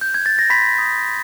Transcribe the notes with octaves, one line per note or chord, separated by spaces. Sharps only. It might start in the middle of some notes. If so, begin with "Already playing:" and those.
G6
G#6
A6
A#6
B5 C6 B6
D#6 G6
C6